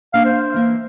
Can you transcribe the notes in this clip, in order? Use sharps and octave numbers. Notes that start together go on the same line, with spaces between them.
A#3 D4 E5 F5
C5
E3 A#3 E5